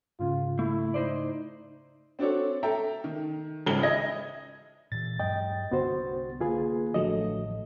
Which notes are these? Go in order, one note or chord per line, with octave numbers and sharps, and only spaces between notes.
G#2 C#3 F4
A3 E4
D#4 C5 D5
C4 D4 F#4 A4 C#5
A4 E5 G5 A#5
D#3
G#1 C#2 C#3 G7
D#5 E5 G#6 A#6
A#2 E3 A6
G2 F#3 G#3 D#5 G5
C2 D3 B3 F#4 C5
D3 A#3 F4 G#4 B4
A1 D3 F3 F#3 A3 D#5